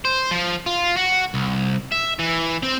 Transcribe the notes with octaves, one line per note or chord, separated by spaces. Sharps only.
C5
F3
F4
F#4
C2
E5
E3
C4